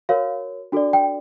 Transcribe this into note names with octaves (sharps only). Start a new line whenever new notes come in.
F#4 A#4 C#5 F5
D4 F#4 A4 D5
G5